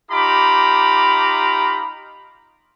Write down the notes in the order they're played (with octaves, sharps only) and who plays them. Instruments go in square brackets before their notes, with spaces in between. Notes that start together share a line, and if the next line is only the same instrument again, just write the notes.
[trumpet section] D#4 F4 G4 A#5 B5 D6